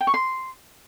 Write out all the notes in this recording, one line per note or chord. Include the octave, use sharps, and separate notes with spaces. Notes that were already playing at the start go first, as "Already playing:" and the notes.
G5
C#6
C6